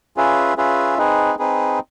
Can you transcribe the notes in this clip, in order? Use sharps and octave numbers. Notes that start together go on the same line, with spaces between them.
C#4 F4 G#4 B4 E5
C#4 F4 G#4 B4 E5
C4 D#4 G#4 B4
C4 D#4 G#4 B4